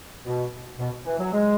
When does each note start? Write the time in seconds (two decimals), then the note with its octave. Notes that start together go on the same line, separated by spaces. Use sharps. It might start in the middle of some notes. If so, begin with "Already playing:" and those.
0.24 B2
0.78 B2
1.05 E3
1.19 F#3
1.33 G#3